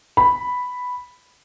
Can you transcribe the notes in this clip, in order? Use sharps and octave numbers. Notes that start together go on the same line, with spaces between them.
B5